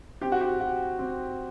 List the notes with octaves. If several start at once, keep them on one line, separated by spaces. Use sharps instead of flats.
C4 G4
F#4
G4
F#4
C4